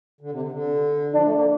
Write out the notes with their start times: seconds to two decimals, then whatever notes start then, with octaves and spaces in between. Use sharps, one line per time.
0.21 D3
0.31 C3
0.41 D3
0.52 D3
1.13 F3 D4
1.24 A3
1.34 A#3